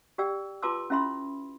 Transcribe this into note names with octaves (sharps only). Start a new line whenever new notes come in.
G4 D5 G5 E6
F4 B4 A5 C6 D6 E6
C#4 E4 E5 B5 C6